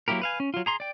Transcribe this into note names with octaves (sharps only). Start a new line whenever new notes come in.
F#3 A#3 E4 G4 A#4
B4 F5 G#5
C#4
F#3 F4
G#4 A#5 C6
D5 G5